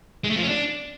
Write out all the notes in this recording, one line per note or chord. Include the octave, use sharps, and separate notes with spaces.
G#3
A3
F3
C#4
D4